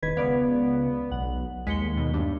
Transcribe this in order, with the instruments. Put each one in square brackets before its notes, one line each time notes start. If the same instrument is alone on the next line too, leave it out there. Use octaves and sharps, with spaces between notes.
[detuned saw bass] E1 [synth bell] D#3 B4 G#6
[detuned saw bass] C#2 [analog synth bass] B3 [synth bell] B4 D5 F5
[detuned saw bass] B1 [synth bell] F#5
[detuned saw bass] D#2 [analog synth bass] G#3 [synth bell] B6 C#7 G7
[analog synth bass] B2
[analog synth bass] G2 [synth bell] D4